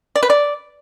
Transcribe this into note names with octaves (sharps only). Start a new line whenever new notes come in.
D5
B4
D5